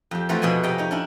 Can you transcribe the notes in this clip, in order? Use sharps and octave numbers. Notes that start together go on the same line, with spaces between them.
F2 G4
E3 F3 A3 C4 F4 F#4
F2 B2 G#4 F#5 G#5
C3 G4 D#5 G5 A#5
D#4 C#5
C#4 D4 E4